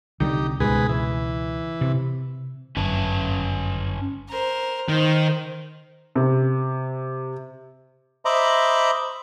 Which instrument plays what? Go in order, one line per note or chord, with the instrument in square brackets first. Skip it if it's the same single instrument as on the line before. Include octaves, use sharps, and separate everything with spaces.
[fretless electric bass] C2 D3 G3 [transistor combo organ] D#4 G4
[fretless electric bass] C#2 B2 [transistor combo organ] G#2 G#4 B4
[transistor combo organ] E3
[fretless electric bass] C3
[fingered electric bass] G1 F#2 [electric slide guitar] C#4 B4 A5
[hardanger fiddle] A#4 C5
[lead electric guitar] D#3 [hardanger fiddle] C5
[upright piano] C3
[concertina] C5 D#5 E5 A#5 B5 D6